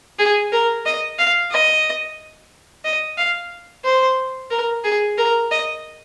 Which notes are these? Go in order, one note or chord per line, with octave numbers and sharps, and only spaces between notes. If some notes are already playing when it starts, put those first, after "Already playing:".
G#4
A#4
D#5
F5
D#5
D#5
F5
C5
A#4
G#4
A#4
D#5